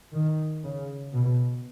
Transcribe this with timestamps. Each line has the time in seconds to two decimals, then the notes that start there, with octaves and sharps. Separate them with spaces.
0.14 D#3
0.64 C#3
1.14 B2